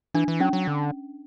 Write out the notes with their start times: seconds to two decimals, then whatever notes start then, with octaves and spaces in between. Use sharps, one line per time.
0.14 E3 D4
0.28 E3
0.40 F#3 C#4
0.53 F#3
0.67 D3